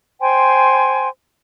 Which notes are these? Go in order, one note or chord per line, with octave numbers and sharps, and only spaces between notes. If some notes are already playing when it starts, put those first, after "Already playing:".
C5 G5 G#5 C6